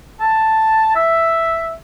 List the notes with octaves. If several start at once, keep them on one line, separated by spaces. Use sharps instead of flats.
A5
E5